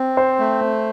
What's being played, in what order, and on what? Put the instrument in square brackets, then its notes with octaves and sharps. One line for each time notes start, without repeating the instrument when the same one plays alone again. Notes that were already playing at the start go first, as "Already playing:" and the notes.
Already playing: [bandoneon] C4
[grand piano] C5
[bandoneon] A3